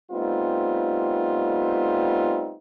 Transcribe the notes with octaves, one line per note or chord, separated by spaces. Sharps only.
G3 A3 B3 C4 D#4 F4